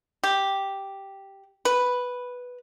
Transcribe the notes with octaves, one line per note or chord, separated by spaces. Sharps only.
G4
B4